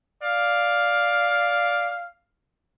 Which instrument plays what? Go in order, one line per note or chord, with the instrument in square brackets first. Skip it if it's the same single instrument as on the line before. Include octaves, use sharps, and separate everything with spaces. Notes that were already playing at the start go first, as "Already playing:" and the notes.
[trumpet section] D5 F5